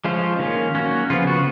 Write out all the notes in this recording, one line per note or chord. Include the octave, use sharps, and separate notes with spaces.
F3 G#3 C#4 F4
D#3 A#3 C#4
F#3 A#3 C#4 F#4
C#3 F3 B3 F4
F#4